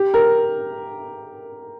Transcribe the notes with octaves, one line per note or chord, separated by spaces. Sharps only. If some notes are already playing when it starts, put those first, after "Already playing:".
Already playing: G4
A#4